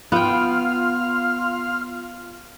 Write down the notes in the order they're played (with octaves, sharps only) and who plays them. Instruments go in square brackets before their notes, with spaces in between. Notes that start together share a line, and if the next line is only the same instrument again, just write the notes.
[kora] B3 G5 [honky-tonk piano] F4 [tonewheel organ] F5 C6 F6